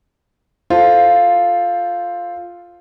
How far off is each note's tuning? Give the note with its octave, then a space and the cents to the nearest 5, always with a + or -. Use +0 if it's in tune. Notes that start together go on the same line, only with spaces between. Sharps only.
F4 +0 A4 +0 C5 +0